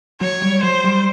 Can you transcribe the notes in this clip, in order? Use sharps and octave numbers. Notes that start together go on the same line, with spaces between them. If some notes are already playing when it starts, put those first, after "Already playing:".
F#3 C#5
G3
F#3 C5
G3